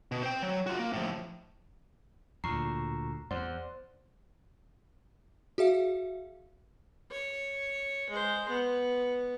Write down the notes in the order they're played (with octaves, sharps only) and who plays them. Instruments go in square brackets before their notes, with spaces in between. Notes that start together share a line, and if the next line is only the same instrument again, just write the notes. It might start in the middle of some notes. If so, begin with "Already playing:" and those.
[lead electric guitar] B2
C5 G5
F#3
F4 F#4
A#3
A2 F3
[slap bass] D2 [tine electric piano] A#2 C#6 C7 [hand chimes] A#5
[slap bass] E2 [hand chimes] C5 [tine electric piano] D5 F#5 C6
[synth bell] F#4 G#4 E5 F5
[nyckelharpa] C#5
G#3 C5
B3